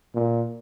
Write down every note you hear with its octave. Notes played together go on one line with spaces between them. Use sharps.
A#2